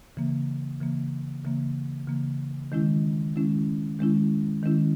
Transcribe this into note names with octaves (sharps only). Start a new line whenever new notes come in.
C#3 E3 A#3
C#3 E3 A#3
C#3 E3 A#3
C#3 E3 A#3
D#3 G#3 C#4 E4
D#3 G#3 C#4 E4
D#3 G#3 C#4 E4
D#3 G#3 C#4 E4